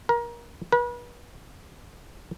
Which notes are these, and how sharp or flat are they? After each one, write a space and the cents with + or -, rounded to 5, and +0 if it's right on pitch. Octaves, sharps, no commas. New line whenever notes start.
A#4 +25
B4 -35